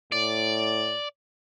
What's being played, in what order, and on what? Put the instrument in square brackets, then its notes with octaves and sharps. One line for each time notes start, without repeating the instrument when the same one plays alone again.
[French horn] A2 [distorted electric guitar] D5